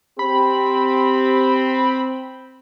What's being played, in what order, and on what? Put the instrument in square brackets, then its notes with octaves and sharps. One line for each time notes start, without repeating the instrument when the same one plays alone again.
[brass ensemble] C4 [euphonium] G4 [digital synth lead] B5